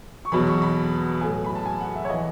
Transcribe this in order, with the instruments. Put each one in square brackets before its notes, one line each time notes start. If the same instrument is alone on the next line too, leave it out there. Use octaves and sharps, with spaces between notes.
[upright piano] C#6
E2 B2 F#3 B5
C#6
B5
A2 F#3 G#5
B5
A5
G#5
F#5
E5
C#5
E3 D#5